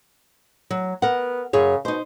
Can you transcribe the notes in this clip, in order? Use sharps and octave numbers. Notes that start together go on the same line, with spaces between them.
F#3
B3 A#4 F#5
F#2 C#3 G#4 C#5
B2 D#4 C5